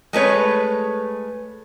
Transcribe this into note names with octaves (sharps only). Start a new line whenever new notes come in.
G#3 A3 B4 C#5